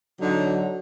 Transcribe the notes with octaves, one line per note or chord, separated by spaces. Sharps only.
D3 F#3 D#4